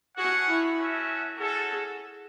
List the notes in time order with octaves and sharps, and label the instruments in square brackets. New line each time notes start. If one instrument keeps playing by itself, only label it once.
[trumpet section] A3 C#4 G#4 C#5 F#5 [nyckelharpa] F#4
[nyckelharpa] E4
[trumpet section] A3 C#4 F#4 C#5 E5
[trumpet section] C#4 F#4 A4 [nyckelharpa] G#4